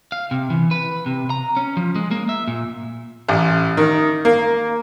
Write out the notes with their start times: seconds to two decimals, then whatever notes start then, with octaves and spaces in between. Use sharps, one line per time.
0.12 F5
0.31 C3
0.50 E3
0.71 B4
1.06 C3
1.30 A#5
1.57 C#4
1.77 F3
1.95 G#3
2.11 A#3
2.29 E5
2.48 A#2
3.29 A1
3.77 D#3
4.25 A#3